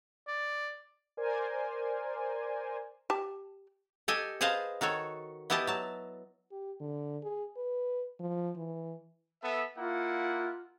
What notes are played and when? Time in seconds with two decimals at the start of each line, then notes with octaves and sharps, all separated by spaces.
0.28 D5
1.17 A#4 C5 D5 G#5
3.10 G4 A5
4.08 G4 A4 D#5 G#5
4.41 G#4 B4 C5 D#5 F5 A5
4.81 D#3 F#4 A4 C#5
5.50 B3 E4 G4 D#5 A5
5.67 F#3 A5
6.51 G4
6.81 D3
7.23 G#4
7.57 B4
8.20 F3
8.56 E3
9.43 B3 A4 E5
9.78 A#3 E4 F4 F#5